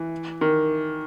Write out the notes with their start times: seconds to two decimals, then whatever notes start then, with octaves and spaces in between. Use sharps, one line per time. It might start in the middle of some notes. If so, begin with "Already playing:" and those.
Already playing: E3
0.41 D#3